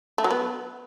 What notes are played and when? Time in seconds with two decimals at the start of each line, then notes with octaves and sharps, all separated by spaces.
0.18 A3
0.24 F#3
0.31 B3